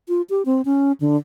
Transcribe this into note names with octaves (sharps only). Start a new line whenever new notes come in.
F4
G4
C4
C#4
D3